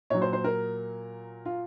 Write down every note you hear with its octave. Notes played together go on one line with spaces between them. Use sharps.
A#2 F#3 C#5
C5
C5
A#4
F4